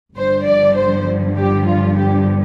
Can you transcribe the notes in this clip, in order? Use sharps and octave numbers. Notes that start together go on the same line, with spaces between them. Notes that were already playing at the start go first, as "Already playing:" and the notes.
G1 G2 D3 F3 C5
D5
C5
G4
F4
G4